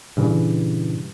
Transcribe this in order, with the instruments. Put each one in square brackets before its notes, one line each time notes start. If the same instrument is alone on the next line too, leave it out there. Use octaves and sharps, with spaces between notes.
[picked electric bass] G2 A#2 C#3 E3